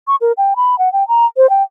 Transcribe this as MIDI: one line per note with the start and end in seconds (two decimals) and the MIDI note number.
0.08 0.16 85
0.21 0.32 70
0.38 0.54 79
0.56 0.78 83
0.79 0.92 78
0.93 1.07 79
1.08 1.26 82
1.37 1.49 72
1.50 1.63 79